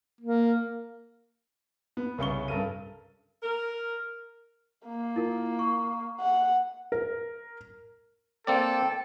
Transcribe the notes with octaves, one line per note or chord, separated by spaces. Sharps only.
A#3
B3
C2 C#3 C#6 G7
G2 A4 A#4 D#7
A#4
A#3
E4 F4 A#4
C#6
F#5
A#4
A#3 C4 A4 D5 G5